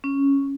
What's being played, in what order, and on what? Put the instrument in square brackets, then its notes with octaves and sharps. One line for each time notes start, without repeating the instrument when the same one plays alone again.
[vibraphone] C#4